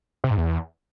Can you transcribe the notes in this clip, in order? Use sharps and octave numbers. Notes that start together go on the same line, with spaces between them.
C3
G#2
E2